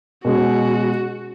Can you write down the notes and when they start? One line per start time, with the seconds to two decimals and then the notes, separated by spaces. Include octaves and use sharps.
0.25 B2 G#3 C#4 F#4